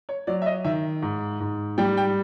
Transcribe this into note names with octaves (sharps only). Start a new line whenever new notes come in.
C#5
F#3 D5
E5
D#5
D#3 E5
G#2
G#2
G3 G5
G5